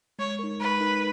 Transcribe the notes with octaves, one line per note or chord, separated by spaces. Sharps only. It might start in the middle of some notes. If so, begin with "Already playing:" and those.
G#3 C#5
D#4 A#4
G#3 B4
D#4 A#4